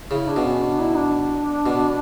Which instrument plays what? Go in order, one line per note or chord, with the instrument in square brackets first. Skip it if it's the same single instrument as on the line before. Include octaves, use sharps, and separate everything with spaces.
[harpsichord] C#3 [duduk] E4
[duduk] D4
[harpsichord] B2
[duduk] C#4
D4
E4
D4
[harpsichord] B2